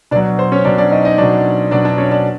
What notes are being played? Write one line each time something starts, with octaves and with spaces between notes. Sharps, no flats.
B2 F#3 D4 D5
C5
C#4 C#5
B2 F#3 D4 D5
D4 D5
D#4 D#5
D#4 D#5
B2 F#3 D4 D5
B2 F#3 D4 D5
D4 D5
C#4 C#5
D4 D5